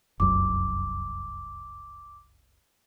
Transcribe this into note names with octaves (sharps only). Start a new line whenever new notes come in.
F1 C2 F#2 D6